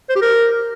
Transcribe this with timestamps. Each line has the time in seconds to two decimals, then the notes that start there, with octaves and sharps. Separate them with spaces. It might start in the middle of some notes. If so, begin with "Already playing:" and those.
0.10 C5
0.16 G4
0.22 A#4